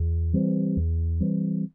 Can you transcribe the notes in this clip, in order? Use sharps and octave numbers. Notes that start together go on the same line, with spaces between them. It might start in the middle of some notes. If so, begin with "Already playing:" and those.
Already playing: E2
E3 G3 C4
E2
E3 G3 C4